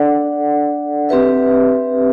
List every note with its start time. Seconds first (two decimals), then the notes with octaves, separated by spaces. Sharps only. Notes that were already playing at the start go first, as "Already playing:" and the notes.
Already playing: D4 A4 D5 F#5
1.09 C4 G4 B4 E5